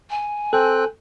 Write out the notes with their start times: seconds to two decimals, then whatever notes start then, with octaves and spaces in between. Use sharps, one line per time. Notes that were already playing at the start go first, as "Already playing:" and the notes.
0.10 G#5
0.53 C4 A4 G5 F#6